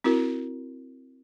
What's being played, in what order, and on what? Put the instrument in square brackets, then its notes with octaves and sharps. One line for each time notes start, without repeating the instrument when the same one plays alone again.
[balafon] C4 E4 F#4 A#4